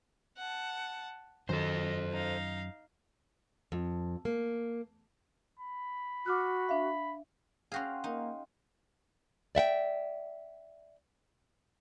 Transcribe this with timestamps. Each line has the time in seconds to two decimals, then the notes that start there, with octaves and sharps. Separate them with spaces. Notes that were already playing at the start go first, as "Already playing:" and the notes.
0.37 F#5 A5
1.49 F#2 D#3 A4 C5 D#5
2.12 D#4 F5
3.72 F2
4.25 A#3
5.59 B5
6.26 F#4 D6 F6 F#6
6.69 D4 E5 F5
7.72 C#4 F#4 G#4 F5 G5 C6
8.04 A#3 D#4
9.55 D5 E5 F#5 G5